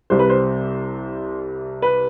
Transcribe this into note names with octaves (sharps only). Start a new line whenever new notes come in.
C2 C3 G3 C5
B4
C5
B4